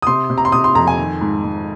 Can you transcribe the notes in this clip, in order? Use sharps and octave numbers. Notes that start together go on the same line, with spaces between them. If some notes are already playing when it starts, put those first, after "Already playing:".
D#6
C3 C6
C3
A#5
C6
C3 D#6
C6
F2 A#5
G#5
D#3
G#2
G#2